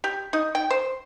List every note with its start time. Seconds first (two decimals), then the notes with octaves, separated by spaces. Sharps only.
0.04 G4
0.33 D#4
0.55 G5
0.70 C5